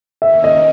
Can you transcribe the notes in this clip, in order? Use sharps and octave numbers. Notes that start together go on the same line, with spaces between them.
D#3 A#3 C#4 E5
D#5